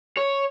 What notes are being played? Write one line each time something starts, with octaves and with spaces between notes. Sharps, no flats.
C#5